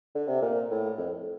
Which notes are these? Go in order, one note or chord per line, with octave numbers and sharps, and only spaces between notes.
D3
C3
A#2
A2
F2